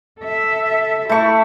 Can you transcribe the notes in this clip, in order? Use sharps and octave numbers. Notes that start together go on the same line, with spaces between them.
A4 E5
A3 E4 C#6